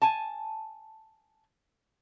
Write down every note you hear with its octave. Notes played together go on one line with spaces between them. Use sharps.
G#5 A5